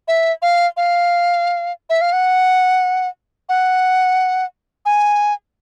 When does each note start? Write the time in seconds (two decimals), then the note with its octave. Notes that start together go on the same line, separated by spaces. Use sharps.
0.08 E5
0.42 F5
0.77 F5
1.90 E5
2.01 F5
2.13 F#5
3.49 F#5
4.86 G#5